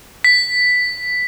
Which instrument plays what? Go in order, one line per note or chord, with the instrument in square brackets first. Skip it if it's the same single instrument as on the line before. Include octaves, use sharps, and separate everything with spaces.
[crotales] B6